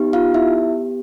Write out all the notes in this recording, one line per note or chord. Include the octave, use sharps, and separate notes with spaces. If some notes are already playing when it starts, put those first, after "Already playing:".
Already playing: B3 D#4 G4
F4 F5
E4 E5